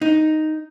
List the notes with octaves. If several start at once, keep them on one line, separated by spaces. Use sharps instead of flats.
D#4